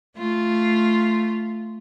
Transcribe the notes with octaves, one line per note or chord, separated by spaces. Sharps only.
A3 F4